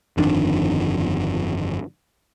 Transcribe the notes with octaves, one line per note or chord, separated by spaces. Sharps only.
G1 F2 D#3 D4